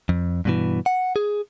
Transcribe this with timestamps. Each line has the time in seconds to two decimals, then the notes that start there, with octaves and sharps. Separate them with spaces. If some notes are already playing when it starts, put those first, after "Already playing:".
0.09 F2
0.45 G2 B2 E3
0.86 F#5
1.16 G#4